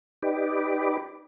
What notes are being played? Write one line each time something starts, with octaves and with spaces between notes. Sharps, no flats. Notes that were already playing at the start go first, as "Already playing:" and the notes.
D#4 G4 B4 D5